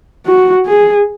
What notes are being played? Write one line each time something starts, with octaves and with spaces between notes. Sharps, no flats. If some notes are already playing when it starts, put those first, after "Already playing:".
F#4
G#4